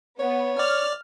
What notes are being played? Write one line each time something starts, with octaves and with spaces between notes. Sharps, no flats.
B3 C#5
D5 F6